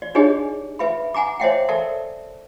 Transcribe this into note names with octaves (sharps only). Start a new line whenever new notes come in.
D5
D4 D#4 G4 G#4 C#5 D#5
B4 E5 B5
F#5 G#5 A#5 D6
C5 C#5 D#5 E5 F#5 G5
A4 A#4 D5 E5 A5